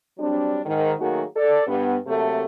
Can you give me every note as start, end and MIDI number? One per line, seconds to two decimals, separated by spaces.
0.18 0.59 54
0.18 0.59 55
0.18 0.59 60
0.18 0.59 62
0.65 0.92 44
0.65 0.92 51
0.99 1.22 51
0.99 1.22 54
0.99 1.22 57
0.99 1.22 58
0.99 1.22 66
0.99 1.22 68
1.35 1.66 69
1.35 1.66 74
1.67 1.96 43
1.67 1.96 59
2.06 2.45 48
2.06 2.45 54
2.06 2.45 57
2.06 2.45 58
2.06 2.45 69